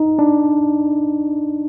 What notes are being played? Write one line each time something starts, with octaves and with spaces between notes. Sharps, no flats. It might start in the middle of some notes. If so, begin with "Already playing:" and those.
Already playing: D#4
D4